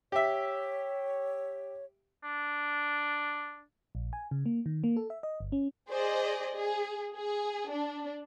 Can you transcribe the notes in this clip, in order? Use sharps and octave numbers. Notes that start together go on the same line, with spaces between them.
G4 C#5 E5
D4
A#1
G#5
C#3
A#3
D#3
A#3
A4
E5
D#5
G1
C#4
G#4 C5 D5 D#5
G#4
G#4
D4